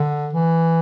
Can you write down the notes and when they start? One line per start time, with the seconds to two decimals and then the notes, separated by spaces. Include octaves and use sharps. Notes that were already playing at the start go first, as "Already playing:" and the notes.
Already playing: D3
0.33 E3